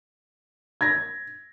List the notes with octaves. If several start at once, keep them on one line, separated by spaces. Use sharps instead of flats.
G#6 A#6